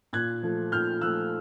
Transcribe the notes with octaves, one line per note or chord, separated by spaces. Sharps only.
A#2 F#6 G#6
F3 A3
A#2 F6 G6
F3 A3 E6 F#6